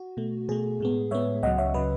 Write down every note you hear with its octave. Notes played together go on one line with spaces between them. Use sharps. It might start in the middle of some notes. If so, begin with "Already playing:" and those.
Already playing: F#4
B2 A3
B2 A3 G#4
A2 G#3 B3
A2 G#3 B3 C#5 E5
C#2 C#3 F#3 D#5 F#5
C#5 E5
C#3 F#3 B4 D#5